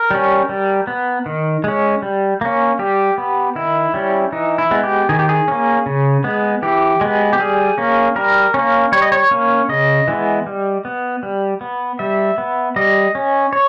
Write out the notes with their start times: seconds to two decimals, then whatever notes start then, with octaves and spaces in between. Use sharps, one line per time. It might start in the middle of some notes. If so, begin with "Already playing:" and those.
Already playing: A#4
0.11 G3 C#4
0.49 G3
0.87 B3
1.26 D#3
1.64 G#3 C#4
2.02 G3
2.41 A#3 C#4
2.79 G3 G4
3.18 B3
3.56 D#3 E4
3.94 G3 C#4
4.32 E3 D#4
4.58 E4
4.71 G#3 B3
4.83 G4
5.09 D#3 G#4
5.19 G4
5.29 G#4
5.48 A#3 C#4
5.86 C#3
6.24 G#3 B3
6.62 E3 G4
7.01 G#3 B3
7.33 G4
7.39 G3 G#4
7.78 A#3 C#4
8.16 G3 A#4
8.54 A#3 C#4
8.92 G3 C#5
9.02 D#5
9.12 C#5
9.31 A#3 C#4
9.69 C#3 D#5
10.08 E3 G#3 B3
10.46 G3
10.85 B3
11.23 G3
11.61 B3
11.99 G3 E5
12.38 B3
12.76 G3 D#5
13.15 C#4
13.53 C#5